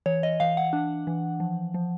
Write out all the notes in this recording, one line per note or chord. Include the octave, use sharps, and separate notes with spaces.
E3 C#5
D#5
E3 F5
F#5
D4
E3
F3
F3